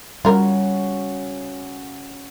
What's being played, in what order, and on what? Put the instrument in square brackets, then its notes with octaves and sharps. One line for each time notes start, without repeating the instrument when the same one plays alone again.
[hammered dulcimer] C#3 F#4 [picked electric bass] G3 [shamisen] F4 A#4